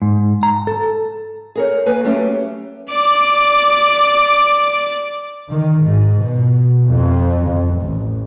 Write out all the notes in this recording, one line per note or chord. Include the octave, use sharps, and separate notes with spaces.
G#2
A#5
A4
G#4 A#4 C#5
A#3 B4 G#5
F#3 A3 C#4 G4
D5 D6
D#3
G#2
B2
F2
F2
A1